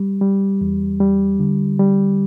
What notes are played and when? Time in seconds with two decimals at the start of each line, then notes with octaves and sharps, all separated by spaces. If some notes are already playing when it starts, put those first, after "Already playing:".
Already playing: G3
0.21 G3
0.61 E2
1.00 G3
1.40 D3
1.79 G3